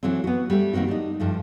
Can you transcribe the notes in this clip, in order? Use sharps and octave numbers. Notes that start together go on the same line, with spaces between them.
E3 F#3 A3 C4
B3 F#4
G3 A3
D#3 F#3 A#3 C4 F#4
D4 D#4
G2 F3 A3